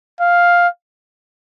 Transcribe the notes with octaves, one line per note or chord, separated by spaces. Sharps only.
F5